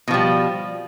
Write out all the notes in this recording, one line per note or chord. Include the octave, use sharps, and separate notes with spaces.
B2 F3 G3